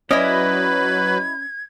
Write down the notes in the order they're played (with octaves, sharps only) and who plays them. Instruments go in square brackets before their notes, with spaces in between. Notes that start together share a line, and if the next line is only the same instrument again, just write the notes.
[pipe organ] F#3 B4 [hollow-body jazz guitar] C#4 D5 [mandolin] E4 D#5 [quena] G#6